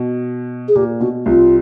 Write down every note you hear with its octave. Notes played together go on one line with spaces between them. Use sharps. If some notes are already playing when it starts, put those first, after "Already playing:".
Already playing: B2
G#4
A#2 G4
B2 F#4
C2 C3 F4